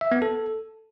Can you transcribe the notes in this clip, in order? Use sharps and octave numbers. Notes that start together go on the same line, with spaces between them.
E5
B3
A4